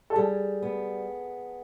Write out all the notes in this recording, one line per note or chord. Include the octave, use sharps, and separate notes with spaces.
A4
G3 G#4
B3